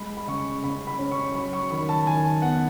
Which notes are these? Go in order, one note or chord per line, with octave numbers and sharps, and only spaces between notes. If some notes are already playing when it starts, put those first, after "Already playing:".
Already playing: G#3 B5
B5
C#3 C#6
C#3 B5
B5
C#4
C#6
F#3 B5
C#6
D#3 B5
A5
D#3 G#5
B3 F#5